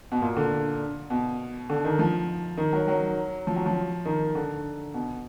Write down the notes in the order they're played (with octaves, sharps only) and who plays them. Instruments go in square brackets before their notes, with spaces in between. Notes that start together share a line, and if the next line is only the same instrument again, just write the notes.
[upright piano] B2
A#2
D3
B2
D3
D#3
F3
D#3
F#3
F#3
F3
F#3
F3
D#3
D3
B2